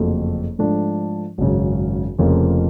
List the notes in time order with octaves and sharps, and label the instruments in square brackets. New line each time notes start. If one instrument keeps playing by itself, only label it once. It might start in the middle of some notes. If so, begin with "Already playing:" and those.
Already playing: [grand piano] F#1 F2 D3 F#3 A3
G#2 F3 A3 D4
G#1 F#2 C#3
F1 F2 C#3 F3 A#3